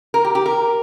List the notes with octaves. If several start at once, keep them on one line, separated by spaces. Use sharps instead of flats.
A#4
G4
G4
A#4